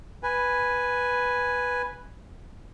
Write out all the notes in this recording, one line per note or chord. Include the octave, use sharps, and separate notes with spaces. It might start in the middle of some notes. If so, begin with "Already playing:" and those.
B4 G#5